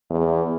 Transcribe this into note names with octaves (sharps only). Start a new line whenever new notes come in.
E2